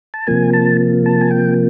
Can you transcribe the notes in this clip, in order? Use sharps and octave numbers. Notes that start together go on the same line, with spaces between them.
A5
C3 F3 A#3 G#5
A5
A5
G#5
G5